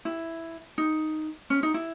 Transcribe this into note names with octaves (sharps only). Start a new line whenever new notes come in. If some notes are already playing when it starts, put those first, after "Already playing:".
E4
D#4
C#4
D#4
E4